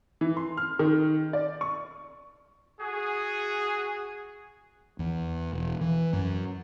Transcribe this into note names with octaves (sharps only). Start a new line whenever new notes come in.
E3
C6
F6
D#3
D5
C#6
F#4 G#4
E2
E1
E3
F#2